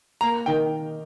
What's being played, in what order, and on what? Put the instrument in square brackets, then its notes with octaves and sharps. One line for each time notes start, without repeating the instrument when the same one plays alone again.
[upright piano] A#3 [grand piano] A#5
[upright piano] D#3 [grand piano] G5